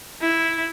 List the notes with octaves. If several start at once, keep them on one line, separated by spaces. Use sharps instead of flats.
E4